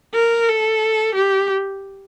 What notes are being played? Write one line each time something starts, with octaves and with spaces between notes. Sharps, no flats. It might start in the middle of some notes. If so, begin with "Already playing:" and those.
A#4
A4
G4